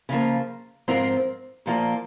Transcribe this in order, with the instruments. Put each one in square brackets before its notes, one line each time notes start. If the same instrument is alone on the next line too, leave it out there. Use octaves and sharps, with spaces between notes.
[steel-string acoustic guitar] C#3 F3 A#3
G#2 F3 C4 F4 A#4
A#2 F3 A#3 F4